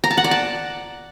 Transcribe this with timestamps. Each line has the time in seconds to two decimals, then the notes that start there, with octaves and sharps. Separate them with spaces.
0.04 A#5
0.11 A5
0.17 F#5
0.24 D5
0.31 A5